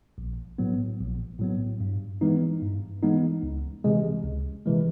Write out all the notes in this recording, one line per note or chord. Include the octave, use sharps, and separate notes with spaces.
A#1
A2 F#3 B3
A#1
A2 F#3 B3
G2
E3 G#3 B3 D#4
G2
E3 G#3 B3 D#4
C#2
C3 E3 G#3
C#2
C3 E3 G#3